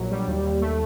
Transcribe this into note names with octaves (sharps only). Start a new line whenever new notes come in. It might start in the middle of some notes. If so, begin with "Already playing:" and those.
Already playing: A#1 F#3
G3
D#2
D#2
A3